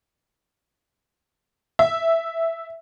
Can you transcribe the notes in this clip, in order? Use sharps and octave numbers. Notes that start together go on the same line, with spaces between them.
E5